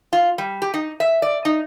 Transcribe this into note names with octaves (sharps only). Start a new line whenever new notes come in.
F4
G3
G4
D#4
E5
D5
D#4